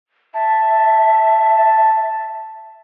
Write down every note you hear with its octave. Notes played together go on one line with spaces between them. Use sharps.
E5 A5